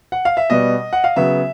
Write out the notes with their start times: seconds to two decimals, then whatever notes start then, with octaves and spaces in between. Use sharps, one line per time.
0.12 F#5
0.25 F5
0.37 E5
0.50 B2 G3 B3 D#5
0.93 F#5
1.04 F5
1.16 C#3 F#3 B3 E5